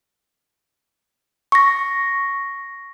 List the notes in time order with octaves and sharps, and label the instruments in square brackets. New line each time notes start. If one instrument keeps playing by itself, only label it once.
[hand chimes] C#6 A#6